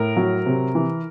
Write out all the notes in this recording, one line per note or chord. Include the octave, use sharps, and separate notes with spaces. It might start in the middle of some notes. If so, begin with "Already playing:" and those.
Already playing: A2 A#4
F#3
C3
E3